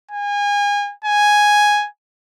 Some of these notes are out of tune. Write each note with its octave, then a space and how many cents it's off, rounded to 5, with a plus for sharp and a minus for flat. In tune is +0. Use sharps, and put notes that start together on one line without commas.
G#5 -30
G#5 +0